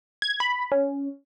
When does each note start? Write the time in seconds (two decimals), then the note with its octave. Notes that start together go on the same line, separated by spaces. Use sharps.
0.22 G#6
0.40 B5
0.72 C#4